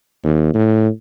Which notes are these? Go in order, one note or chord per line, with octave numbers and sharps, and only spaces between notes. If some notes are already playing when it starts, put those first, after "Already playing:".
D#2
A2